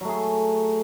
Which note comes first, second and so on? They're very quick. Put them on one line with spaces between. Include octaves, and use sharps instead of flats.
F#3 A3 G#4